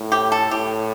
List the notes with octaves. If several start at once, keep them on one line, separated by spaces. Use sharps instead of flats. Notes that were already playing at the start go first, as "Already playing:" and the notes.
Already playing: A2
G4
A4
A2 G4